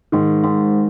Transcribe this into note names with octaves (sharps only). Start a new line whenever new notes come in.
G#2 D#3
G#2